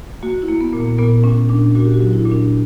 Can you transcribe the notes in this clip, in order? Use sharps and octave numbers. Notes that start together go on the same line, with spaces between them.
A#3 F#4
E4
A#3
B3
A#2
A#3
A#2 B3
A#2 C#4
A#2 D4
A#2 F#4
G4
F#4
F#3
E4
A#2
D4